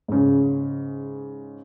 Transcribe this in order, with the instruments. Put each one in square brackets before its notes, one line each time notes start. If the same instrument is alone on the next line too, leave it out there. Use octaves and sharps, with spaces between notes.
[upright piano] G#2 C#3